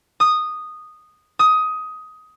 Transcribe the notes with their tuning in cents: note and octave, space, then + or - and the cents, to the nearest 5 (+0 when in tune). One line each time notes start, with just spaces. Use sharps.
D#6 -10
D#6 +15